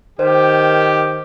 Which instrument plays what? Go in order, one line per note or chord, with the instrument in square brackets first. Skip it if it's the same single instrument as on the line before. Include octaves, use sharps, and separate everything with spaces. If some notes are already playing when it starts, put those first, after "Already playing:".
[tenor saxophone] D#3 [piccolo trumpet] G4 [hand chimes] C5